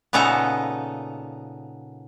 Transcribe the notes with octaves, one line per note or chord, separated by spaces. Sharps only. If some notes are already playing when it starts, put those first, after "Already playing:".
A#2 C#3 B3 D#4 A4 A#5